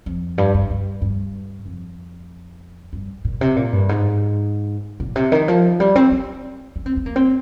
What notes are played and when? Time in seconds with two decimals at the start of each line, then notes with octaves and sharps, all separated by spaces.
0.06 F2
0.38 G2
0.54 G2
0.70 G2
1.02 G2
1.66 F2
2.93 G2
3.25 A#2
3.41 C3
3.56 A#2
3.73 G2
3.89 G#2
5.00 A#2
5.16 C3
5.32 D#3
5.48 F3
5.80 G3
5.95 C4
6.12 C4
6.76 C#4
6.86 C4
6.97 C4
7.06 A#3
7.16 C4